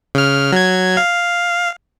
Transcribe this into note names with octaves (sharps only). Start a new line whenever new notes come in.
C#3 F6
F#3 G#6
F5